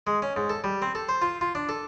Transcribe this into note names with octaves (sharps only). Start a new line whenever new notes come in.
G#3
C#4
G#2
A4
G3
C4
A4
C5
F4
F4
D4
A4